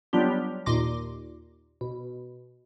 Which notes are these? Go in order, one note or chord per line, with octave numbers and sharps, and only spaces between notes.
F#3 G3 B3 D4 F4 G4
D#2 A#2 C6 D6 A#6
B2